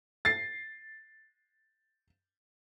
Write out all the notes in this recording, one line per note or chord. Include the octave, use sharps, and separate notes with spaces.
A6 C7